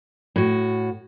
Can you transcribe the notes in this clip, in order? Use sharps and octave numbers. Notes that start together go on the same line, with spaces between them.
A2 F#4